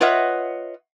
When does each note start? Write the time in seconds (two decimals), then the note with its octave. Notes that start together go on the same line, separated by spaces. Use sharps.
0.01 F4 B4 C#5 D#5 E5 F#5